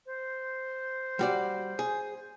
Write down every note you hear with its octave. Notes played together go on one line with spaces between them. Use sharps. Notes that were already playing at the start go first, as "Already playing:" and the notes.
C5
G3 F#4 D5
G#4